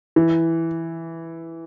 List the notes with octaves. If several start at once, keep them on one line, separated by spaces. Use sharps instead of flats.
E3